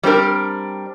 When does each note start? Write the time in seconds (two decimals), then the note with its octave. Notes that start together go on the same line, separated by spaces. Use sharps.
0.03 G3 C4 D4 A#4